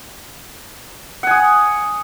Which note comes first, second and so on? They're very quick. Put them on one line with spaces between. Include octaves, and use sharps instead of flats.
F#5 G#5 D#6